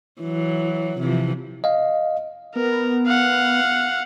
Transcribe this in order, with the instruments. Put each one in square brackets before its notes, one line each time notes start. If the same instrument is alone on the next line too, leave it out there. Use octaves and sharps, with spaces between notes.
[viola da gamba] E3 F#3
C3 E3 F3
[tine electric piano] D#5 F5
[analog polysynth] B3 [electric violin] A#4
[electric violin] F5 F#5